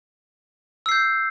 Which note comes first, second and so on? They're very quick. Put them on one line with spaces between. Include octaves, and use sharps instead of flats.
E6 C7 G6